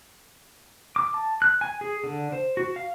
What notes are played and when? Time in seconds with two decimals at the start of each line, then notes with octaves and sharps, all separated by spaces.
0.96 D6
1.14 A5
1.42 F#6
1.61 G#5
1.81 G#4
2.04 D3
2.32 C5
2.57 F#4
2.76 F5